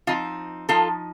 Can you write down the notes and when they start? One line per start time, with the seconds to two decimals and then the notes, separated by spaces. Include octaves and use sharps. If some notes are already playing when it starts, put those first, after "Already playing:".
0.07 F3 C4 D#4 F4
0.69 F3 C4 D#4 F4 A4